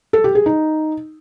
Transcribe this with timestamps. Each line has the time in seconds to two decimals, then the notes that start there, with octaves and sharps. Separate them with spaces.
0.13 A4
0.24 G4
0.35 G#4
0.46 D#4